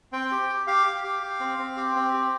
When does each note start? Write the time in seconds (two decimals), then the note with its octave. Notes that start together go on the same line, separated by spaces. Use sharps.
0.12 C4 G5
0.31 G4
0.49 G4
0.67 G4 F5
0.86 G4
1.04 G4
1.23 G4
1.40 C4
1.59 C4
1.77 G4
1.96 C4
2.13 G4